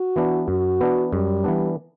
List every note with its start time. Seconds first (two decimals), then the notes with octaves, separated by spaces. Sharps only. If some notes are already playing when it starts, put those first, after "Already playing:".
Already playing: F#4
0.16 E3 B3 D4
0.48 F#2 F#4
0.80 E3 B3 D4
1.13 F#2 G3
1.44 E3 B3 D4